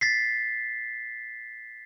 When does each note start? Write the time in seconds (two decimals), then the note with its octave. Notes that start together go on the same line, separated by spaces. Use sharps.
0.01 A6 B6 C7